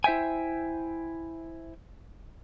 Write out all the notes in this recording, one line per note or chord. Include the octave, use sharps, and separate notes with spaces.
E4 C5 E5 G5 G#5